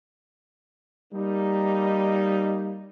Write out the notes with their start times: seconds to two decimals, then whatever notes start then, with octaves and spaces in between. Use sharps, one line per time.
1.13 G3 A#3 D#4